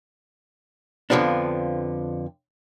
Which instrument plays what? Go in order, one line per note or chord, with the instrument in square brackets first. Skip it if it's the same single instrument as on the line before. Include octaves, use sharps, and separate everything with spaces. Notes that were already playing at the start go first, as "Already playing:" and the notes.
[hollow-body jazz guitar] F2 D3 F3 B3 D4